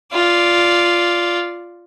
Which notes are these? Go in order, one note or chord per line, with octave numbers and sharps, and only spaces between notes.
F4 D5